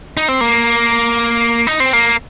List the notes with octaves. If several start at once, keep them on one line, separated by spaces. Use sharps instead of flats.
D#4
C4
A#3
D#4
C4
A#3